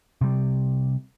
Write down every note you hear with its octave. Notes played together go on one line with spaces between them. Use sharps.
C3 G3